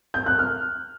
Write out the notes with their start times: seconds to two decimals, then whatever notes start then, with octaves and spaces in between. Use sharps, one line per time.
0.14 G6
0.26 F#6
0.39 F6